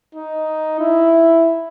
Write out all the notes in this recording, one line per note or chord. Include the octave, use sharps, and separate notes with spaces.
D#4
E4